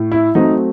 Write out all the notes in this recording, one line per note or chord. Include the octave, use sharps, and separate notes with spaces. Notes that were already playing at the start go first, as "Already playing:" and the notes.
Already playing: A2
E4
F#3 A3 C4 D#4